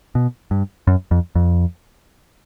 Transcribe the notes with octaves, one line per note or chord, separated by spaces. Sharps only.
B2
G2
F#2
F2
F2